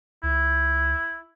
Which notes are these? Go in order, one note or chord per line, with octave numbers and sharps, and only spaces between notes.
C#2 E4